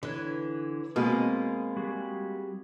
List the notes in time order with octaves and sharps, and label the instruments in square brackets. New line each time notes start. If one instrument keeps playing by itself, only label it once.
[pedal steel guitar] D3 B4 C#5 [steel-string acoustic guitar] E3
[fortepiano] B2 [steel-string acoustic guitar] G#3 A#3 [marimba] C4 [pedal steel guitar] A#4 C5 G#5
[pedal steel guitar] G3 F#4 G#4